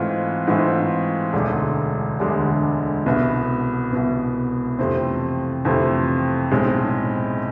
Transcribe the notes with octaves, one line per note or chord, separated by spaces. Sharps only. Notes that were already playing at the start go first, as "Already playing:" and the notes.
Already playing: G#2 E3 A3 C4 F4
G#2 E3 A3 C4 F4
E1 D2 D3 G#3 D4
E1 D2 D3 G#3 D4
C2 B2 B3
C2 B2 B3
F2 C3 E3 A3 C4
F2 C3 E3 A3 C4
B1 A2 G#3 C4